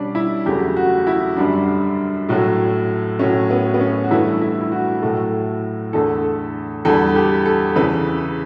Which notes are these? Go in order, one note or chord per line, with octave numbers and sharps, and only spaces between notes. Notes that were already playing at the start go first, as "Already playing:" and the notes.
Already playing: B2 G3 C#4 D4
E4
E2 C#3 F#3 A3 G4
F#4
F#4
E4
F#2 D3 G3 D4
A2 F#3 A3
A2 F#3 A3 C#4
B3
B3
C#4
F#4
G2 E3 A3 E4
E4
E4
F#4
A2 F#3 A3
E2 D3 A3 A4
E2 D3 G3 A4
G4
A4
E2 C#3 E3 B4